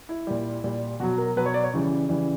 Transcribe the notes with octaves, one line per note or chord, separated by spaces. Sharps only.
E4
A#2 G3
A#2 G3
B2 F#3 F#4
A#4
B2 F#3 B4
C#5
D5
C#5
C#3 E3 G3
C#3 E3 G3